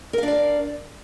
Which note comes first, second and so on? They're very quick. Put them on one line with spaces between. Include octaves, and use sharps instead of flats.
A#4 F5 D4 D5